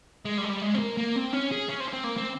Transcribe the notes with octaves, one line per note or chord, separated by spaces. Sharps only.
G#3
G3
G#3
G3
G#3
C4
A#3
A#3
C4
C#4
G#4
C#4
C4
C#4
C4
A#3
C4